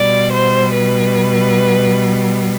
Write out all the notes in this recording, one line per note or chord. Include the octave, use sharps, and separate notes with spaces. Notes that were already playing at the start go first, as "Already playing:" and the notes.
Already playing: B2 G3 D5
C5
B4